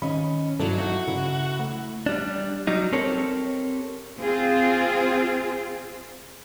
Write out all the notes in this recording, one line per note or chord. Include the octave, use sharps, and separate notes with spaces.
D#3 C#4 D#5 B5
G2 F#3 D#4 E4 A4 D5
F#3 D#4 E4 F#4
C#3 E4
A3
G3 D4
F#3 G3 D#4
C4 G4 A4 A#4 C#5
C4 F4 G#4